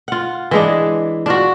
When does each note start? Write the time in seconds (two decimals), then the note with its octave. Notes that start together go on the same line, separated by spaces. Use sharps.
0.08 F4 F#5
0.51 E3 G#3 D4
1.26 D4 F4 F#4